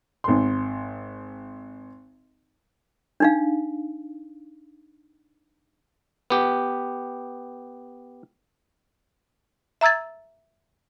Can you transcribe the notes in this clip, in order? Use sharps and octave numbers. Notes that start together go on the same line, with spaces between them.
G#1 C6
D4 D#4 F5
B3 G4
E5 A#5 E6 G#6 A6